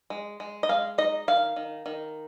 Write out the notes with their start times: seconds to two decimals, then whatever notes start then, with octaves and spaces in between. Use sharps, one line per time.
0.10 G#3
0.40 G#3
0.63 D#5
0.69 G#3 F5
0.98 D#4 D#5
1.28 D#3 F5
1.56 D#3
1.86 D#3